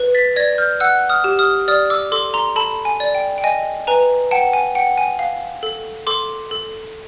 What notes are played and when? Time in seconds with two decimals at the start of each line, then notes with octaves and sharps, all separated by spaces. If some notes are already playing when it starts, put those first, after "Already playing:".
Already playing: B4
0.14 A6 B6
0.36 D5 G#6 A#6
0.58 F6 G6
0.80 F#5 E6 F#6
1.09 D#6 F6
1.24 G4
1.39 D#6 F6
1.68 D5 D#6 F6
1.90 D6 E6
2.12 A4 C6 D6
2.34 A#5 C6
2.56 A4 A5 B5
2.85 G#5
3.00 D5
3.15 G5
3.38 G5
3.44 D#5 G#5
3.87 B4 G#5 A#5
4.31 F#5 G5 A5
4.53 G#5
4.75 F#5 G5
4.98 G#5
5.19 F5
5.63 A4
6.07 A4 C6 D6
6.51 A4